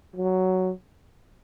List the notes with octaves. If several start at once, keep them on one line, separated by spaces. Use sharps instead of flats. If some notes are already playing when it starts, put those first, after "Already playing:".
F#3